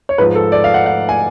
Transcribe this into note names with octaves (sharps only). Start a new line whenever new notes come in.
C#5
G#2 F3 B4
A4
D5
F5
F#5
F#5
G#5